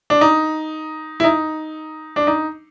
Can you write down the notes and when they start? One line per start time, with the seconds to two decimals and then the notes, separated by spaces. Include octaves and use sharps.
0.10 D4
0.21 D#4
1.20 E4
1.24 D#4
2.16 D4
2.27 D#4